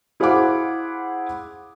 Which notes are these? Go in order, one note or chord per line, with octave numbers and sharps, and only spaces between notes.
E4 G#4 C5 F5 F#5 D6